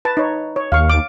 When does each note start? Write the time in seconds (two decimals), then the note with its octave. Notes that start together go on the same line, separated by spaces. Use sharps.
0.05 B4 A5
0.17 D#4 C#5
0.56 C#5
0.72 D#2 F5 C#6
0.89 D6